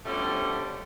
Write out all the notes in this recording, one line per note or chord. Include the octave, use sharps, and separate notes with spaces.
B2 D3 F3 G3 A3 C#4